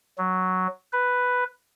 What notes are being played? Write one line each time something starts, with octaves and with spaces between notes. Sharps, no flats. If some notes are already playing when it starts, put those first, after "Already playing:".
F#3
B4